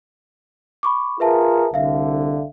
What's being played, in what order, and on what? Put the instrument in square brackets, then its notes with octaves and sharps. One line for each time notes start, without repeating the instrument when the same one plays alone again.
[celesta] B5 C#6 D6
[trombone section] F4 G#4 A#4 [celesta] B4 E5 A5
[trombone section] C2 D3 [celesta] E5 F5